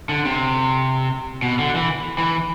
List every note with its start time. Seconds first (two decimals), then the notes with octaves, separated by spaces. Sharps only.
0.09 D3
0.25 C3
1.42 B2
1.59 D3
1.76 E3
2.18 E3